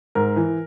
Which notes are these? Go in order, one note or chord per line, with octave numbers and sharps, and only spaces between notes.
G#2 A#4
E3